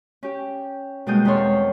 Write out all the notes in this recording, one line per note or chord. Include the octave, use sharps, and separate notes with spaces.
C#4 G4
B2 G3 G#3 A#3 D#6 G6
E2 D#3 C4 A4 C#5 C6